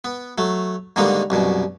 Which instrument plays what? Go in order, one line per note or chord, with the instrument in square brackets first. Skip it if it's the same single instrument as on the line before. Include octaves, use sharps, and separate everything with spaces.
[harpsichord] B3
F#3 A3
G#2 D3 D#3 G3 A#3 B3
C2 F#2 B2